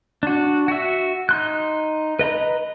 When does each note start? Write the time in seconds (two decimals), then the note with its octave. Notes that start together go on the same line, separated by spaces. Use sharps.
0.23 D4 F#4
0.68 F#4 E5
1.29 D#4 C6 F#6
2.19 B4 D#5 A#5 B5